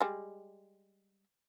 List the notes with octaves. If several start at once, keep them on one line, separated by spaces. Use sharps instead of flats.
G3 G#3